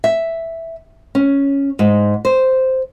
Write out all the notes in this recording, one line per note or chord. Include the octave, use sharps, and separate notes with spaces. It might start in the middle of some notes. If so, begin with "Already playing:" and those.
E5
C#4
G#2
C5